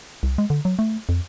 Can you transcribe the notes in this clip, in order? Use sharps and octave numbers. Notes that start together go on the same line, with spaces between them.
C2
G#3
D3
F#3
A3
F2